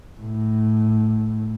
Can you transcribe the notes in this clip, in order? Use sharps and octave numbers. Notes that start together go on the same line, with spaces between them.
A2